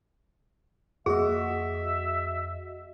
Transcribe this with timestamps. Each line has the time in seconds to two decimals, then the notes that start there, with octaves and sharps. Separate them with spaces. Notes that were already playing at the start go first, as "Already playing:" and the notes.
1.06 F2 A#3 F#4 G#4 D#5 E5